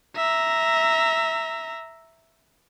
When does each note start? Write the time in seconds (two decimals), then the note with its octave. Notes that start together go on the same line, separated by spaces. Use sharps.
0.16 E5 A#5